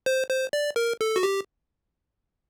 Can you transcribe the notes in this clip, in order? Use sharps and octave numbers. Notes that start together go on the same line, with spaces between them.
C5
C5
D5
A#4
A4
F#4
G4